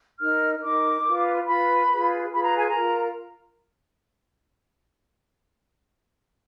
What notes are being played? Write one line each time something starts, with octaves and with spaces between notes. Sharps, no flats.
D#4 A#4 F6
D#4 A#4 D6
F4 B4
F4 B4 B5
F4 G#4 B4
F4 G#4 B4 B5
A#5
G#5
A#5
F4 A#4